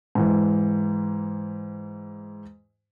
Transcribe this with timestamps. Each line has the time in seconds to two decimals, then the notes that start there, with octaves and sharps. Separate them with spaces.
0.15 G#2 E3